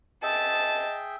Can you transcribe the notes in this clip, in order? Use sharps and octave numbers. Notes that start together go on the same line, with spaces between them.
G#4 D#5 E5 G5 A5